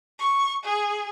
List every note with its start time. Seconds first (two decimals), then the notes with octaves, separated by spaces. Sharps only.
0.19 C#6
0.64 G#4